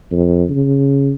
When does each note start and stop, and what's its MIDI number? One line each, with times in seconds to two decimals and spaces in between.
0.12 0.44 41
0.49 1.13 49